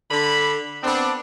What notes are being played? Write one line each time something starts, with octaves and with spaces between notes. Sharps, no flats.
D3 B5
B3 C4 D4